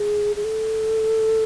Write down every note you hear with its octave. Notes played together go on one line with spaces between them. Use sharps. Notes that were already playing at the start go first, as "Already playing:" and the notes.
Already playing: G#4
G#4
A4